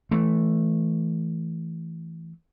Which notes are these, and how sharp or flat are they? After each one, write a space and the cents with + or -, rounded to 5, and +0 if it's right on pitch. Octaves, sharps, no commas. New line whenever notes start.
E3 +0 A3 +0